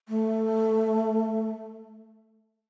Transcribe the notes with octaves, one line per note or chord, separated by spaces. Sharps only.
A3